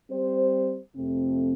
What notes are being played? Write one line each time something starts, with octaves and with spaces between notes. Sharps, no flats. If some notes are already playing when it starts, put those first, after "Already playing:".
G3 C4 G4 C5
F2 C3 A3 C4